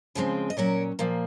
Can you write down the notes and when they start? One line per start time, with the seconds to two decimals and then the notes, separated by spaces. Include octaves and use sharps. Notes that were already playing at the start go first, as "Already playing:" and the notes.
0.15 C#3 F3 G#3 C4
0.50 D#5
0.57 A#2 F#3 C#4 A#4 C#5
0.99 A#2 F3 A#3